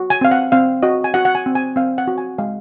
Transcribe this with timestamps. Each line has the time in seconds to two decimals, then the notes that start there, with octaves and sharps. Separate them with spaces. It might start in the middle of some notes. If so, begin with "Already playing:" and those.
Already playing: F#4
0.10 G#5
0.21 C4 F5
0.31 F#5
0.52 C4 F5
0.83 F#4 D#5
1.04 G#5
1.14 F#4 F#5
1.25 F#5
1.35 G#5
1.46 C4
1.55 G#5
1.76 C4 F5
1.98 F#5
2.08 F#4
2.18 G#5
2.38 G#3 F5